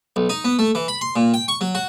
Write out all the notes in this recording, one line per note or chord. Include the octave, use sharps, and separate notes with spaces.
B1
D#4
B3
A3
E3
B5
C6
A#2
G5
C#6
F#3
F#4